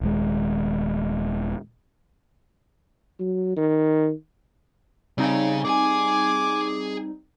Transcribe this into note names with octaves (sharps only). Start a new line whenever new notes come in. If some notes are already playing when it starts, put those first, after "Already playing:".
D#1 D#2 G#3
F#3
D#3
C#3 G3 C4 D#4 G#4
G#4 G#5 D6